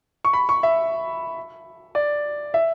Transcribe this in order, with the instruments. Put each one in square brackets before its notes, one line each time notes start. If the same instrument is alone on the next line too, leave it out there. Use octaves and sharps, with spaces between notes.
[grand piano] C#6
B5
C#6
E5
D5
E5